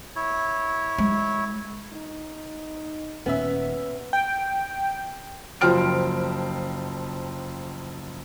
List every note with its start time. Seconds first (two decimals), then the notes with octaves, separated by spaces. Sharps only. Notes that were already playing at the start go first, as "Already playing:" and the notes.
0.16 E4 C#5
0.98 G#3
1.93 D#4
3.26 D#1 B3 C#4 E5
4.13 G5
5.61 F#1 F3 C5 G5 F6 D7